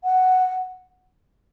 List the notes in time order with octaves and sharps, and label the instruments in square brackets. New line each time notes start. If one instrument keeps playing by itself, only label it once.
[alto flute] F#5